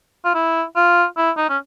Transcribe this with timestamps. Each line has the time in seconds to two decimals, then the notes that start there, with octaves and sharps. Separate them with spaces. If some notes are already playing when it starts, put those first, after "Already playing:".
0.25 F4
0.34 E4
0.76 F4
1.17 E4
1.37 D#4
1.50 C#4